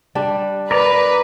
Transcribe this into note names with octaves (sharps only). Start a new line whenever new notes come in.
G3 D4
A#4 B4 D5 A#5